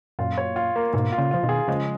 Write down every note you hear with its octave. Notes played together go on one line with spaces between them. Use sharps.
F#2 A#2 F4
C#5
F4
A#3
G#2 B2 F4
F4
A#2 C#3
F3 F4
B2 D#3
G#4
C#3 F3 G#3